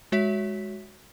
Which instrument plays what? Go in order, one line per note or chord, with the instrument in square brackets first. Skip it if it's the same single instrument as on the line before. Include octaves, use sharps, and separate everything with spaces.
[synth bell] G#3 F#4 C#5 E5 B6